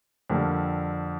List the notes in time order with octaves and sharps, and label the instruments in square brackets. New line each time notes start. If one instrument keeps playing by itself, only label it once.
[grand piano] F2 D3 G3 A#3